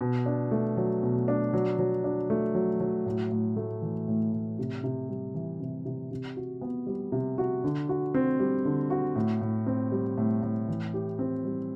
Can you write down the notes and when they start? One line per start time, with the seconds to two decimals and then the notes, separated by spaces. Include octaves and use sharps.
0.01 B2
0.26 D4
0.51 A3
0.77 F#3
1.03 B2
1.28 D4
1.53 F#3
1.79 F#3
2.04 D4
2.30 A3
2.55 F#3
2.80 F#3
3.06 A2
3.32 A2
3.56 A3
3.82 E3
4.08 A2
4.33 A2
4.59 C3
4.84 C3
5.09 G3
5.34 E3
5.60 C3
5.86 C3
6.11 C3
6.37 F#4
6.61 B3
6.87 G3
7.12 C3
7.38 F#4
7.64 D3
7.89 F#4
8.14 C4
8.39 G3
8.65 D3
8.90 F#4
9.16 A2
9.41 A2
9.66 C4
9.92 G3
10.18 A2
10.43 A2
10.68 E3
10.94 G4
11.19 C4
11.45 G3